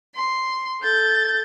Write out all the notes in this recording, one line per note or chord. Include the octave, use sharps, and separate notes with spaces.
C6
A4 G6 A6